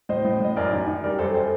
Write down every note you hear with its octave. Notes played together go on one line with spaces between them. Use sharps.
A2 C5 D#5
A2
A2 D#5
F#2 A#4 D5
D#3
D#3
G3 A#4 D5
F#2 A4 C5
A4 C5